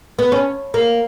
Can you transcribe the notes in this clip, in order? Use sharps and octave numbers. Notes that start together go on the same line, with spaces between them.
B3
C#4
A#3